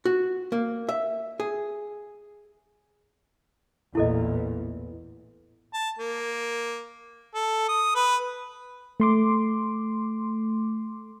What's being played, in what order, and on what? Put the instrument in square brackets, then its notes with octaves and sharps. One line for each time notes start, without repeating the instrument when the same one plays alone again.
[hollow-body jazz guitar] F#4
A#3
E5
G#4
[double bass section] A1 E2 A#2 [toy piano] E4 A4 D#5
[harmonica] A5
A#3
A4
D#6
B4
[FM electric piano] A3 C6 D6